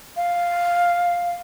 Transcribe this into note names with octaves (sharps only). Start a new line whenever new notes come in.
F5